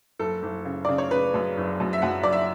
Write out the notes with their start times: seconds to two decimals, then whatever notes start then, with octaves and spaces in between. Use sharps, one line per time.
0.19 F#1 A4
0.43 F#1
0.65 C#3
0.85 C#3 D5
0.98 C#5
1.11 C#3 B4
1.34 F#2
1.57 F#1
1.80 F#2
1.93 E5
2.02 F#2 F#5
2.23 F#1 D5
2.33 E5